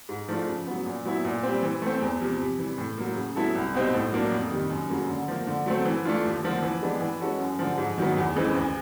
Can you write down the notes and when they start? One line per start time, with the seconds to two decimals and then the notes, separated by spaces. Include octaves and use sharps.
0.09 G#2
0.29 F3 A3 D4 F4
0.47 C#3
0.67 F#3 B3
0.86 A#2
1.05 F#3 B3 E4
1.25 A#2
1.43 G3 C4
1.63 E3
1.82 A3 C4
2.01 E2
2.20 C3 F3
2.40 C3
2.59 E3 G3
2.78 A2
2.98 F#3 A#3
3.16 C#3
3.36 F#3 B3 E4 A4
3.55 C2
3.74 B2 G3 C4 D#4
3.94 A2
4.12 F#3 A#3 D4
4.32 F2
4.51 C3 D#3 G3
4.70 F#2
4.90 C#3 F#3 A#3
5.09 D3
5.28 F3 A#3
5.47 D3
5.66 F#3 A3 C4
5.86 E3
6.05 A3 D4 F4
6.25 D#2
6.44 D3 F3 A#3
6.63 E3
6.82 G#3 B3 D4 G4
7.01 E3
7.21 G#3 C#4 F#4 A4
7.40 F#2
7.59 D3 F3
7.78 G#2
7.98 D#3 F#3 B3
8.17 E2
8.36 C#3 E3 G#3 C4
8.55 D2